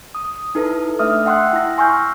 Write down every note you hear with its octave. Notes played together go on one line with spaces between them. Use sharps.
D#6
D#4 E4 A4 B4
A3 D4 E5 D#6 F6
E5 F#5 G5 C6 E6 F#6
E4 A#6
G#5 C6 C#6 E6 F6 G6